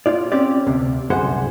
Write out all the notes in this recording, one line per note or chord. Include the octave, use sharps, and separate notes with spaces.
F4 D5
C4 C#4 G4 D5
D2 C3
C2 F#2 D3 G#4 C5 F#5